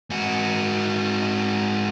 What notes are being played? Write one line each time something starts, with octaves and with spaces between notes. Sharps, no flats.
G#2 F#4